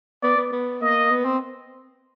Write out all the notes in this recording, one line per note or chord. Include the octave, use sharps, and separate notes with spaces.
B3 D5
B3
B3
A#3 D#5
B3
C4